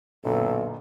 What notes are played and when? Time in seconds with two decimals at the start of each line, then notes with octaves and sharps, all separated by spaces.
0.25 B1 F#2 A#2 D3 A4